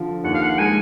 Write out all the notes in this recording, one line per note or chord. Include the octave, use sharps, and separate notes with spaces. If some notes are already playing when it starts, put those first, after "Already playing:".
Already playing: D3 F3
D#2 F#5
F5
F#5
G#3 G#5